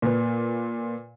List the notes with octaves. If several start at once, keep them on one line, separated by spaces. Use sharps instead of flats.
A#2 B4